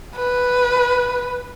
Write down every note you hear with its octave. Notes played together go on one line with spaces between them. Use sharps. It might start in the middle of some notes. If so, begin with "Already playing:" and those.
B4